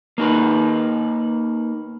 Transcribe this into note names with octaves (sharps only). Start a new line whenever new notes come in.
A#3 D#4 B4